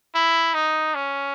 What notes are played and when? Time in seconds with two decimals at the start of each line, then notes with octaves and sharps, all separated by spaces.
0.15 E4
0.54 D#4
0.95 C#4